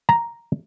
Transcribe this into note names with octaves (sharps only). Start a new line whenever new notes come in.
A#5